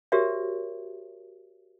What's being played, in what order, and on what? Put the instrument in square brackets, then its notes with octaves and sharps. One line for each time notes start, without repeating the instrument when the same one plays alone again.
[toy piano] F#4 G4 A#4 C5 C#5 E5